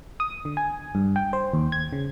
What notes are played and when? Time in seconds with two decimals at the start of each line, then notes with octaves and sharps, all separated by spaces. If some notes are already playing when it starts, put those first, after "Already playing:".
0.20 D#6
0.45 D3
0.57 G#5
0.95 G2
1.16 G5
1.33 C5
1.54 D#2
1.72 G#6
1.93 C#3